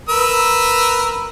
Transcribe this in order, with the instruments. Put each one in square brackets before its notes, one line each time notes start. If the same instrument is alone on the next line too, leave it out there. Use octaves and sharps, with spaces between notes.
[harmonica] A#4 B4 E6